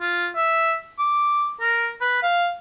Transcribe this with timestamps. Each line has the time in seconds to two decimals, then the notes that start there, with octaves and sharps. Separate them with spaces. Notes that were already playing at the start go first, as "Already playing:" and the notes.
0.01 F4
0.35 E5
0.99 D6
1.61 A#4
2.01 B4
2.22 F5